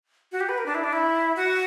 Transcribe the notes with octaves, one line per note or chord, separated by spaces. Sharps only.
F#4
G4
B4
A#4
D4
E4
D4
E4
F#4